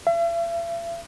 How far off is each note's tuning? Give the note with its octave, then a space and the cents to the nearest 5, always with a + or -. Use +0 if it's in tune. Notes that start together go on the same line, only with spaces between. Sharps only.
E5 +45